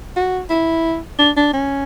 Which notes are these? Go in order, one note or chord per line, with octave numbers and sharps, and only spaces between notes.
F#4
E4
D4
D4
C#4